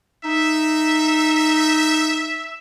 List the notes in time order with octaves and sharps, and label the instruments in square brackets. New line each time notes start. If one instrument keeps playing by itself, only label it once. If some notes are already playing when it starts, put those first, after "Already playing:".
[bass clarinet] D#4 [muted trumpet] E5